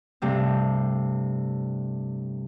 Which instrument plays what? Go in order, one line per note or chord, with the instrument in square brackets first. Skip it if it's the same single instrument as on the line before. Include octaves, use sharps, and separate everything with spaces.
[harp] G2 C3 A3